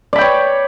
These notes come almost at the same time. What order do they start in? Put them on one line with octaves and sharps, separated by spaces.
D5 B5 G5 C#5